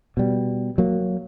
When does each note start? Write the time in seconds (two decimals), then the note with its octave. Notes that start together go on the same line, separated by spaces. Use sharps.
0.17 B2 G3
0.78 F#3 A#3